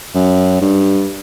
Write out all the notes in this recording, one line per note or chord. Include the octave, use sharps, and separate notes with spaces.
F#2
G2